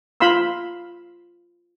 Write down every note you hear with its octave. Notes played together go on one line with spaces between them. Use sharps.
F4 F5 B5 C6 E6